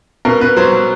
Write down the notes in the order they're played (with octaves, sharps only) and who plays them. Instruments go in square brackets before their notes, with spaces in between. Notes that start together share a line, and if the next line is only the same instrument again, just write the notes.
[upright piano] B2 A#4
B2 B4
F#3 C5
F#3